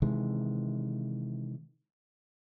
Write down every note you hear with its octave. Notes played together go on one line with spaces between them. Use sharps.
C3 D#3 E3 G#3